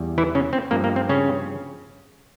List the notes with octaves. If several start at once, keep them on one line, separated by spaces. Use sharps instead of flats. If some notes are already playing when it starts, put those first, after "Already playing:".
Already playing: E2 G3
E3 E4
C#3 C#4
C4
G2 F3 A#3
A#3
C4
C#3 C#4